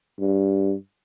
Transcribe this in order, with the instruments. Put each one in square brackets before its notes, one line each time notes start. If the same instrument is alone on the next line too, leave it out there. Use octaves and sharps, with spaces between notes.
[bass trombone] G2